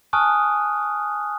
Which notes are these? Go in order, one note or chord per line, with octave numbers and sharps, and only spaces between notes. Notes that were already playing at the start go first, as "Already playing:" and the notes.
G#5 A5 C#6 D#6 F6 F#6